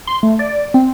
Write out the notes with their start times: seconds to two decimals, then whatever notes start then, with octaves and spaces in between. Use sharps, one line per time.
0.07 C6
0.23 A3
0.39 D5
0.74 C4